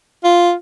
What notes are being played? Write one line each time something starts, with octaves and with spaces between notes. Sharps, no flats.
F4